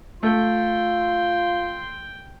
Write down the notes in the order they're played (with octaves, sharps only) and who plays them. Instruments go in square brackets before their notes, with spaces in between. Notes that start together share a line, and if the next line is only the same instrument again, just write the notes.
[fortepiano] A3 [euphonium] F4 [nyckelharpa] G5 [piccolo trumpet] C6